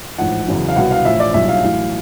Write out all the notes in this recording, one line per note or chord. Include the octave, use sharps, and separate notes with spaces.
A1 G#2 F3 F#5
E2 C#3 F#3
F5
C2 B2 F#3 F#5
F5
A1 A2 F3 E5
D5
B1 A#2 G3 E5
F5
A1 A2 F#3